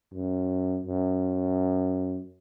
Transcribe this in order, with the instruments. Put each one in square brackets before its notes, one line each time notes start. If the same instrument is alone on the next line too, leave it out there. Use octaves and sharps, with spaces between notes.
[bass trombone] F#2
F#2